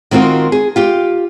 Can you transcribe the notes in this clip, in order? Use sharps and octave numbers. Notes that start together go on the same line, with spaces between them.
D#3 C4 F4 F#4 A#4
G#4
F4 G4